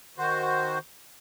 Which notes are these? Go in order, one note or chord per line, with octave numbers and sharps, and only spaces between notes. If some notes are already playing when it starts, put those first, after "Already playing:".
D#3 F#4 C5